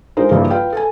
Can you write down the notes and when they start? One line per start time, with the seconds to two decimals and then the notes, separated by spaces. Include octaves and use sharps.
0.17 G#3 D#4 F4 A#4 C5
0.31 G2 C#3 F3 G3 A#3 E4
0.51 F4 B4 F5 G5
0.72 A4 G#5